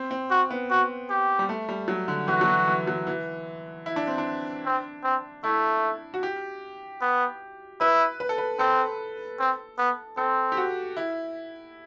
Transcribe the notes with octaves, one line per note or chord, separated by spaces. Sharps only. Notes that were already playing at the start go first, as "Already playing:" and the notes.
Already playing: C4
C4
F#4
B3
F#4
G4
G3
A3
G3
F#3
D3
E3 F#4
F#3
E3
E3
F#3
E3
E4
D4
C4
D4
C4
C4
A3 E4
F#4
G4
B3
E4 B4
B4
A4
B4
C4 A4
C4
B3
C4 A4
G4
F#4
E4